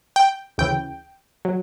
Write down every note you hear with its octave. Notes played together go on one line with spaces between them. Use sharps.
G5
D2 C#3 E3 G5
F#3